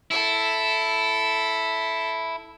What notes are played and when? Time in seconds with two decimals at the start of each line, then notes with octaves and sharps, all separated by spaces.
0.11 E4 A4